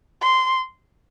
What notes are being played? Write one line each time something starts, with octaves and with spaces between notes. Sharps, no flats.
C6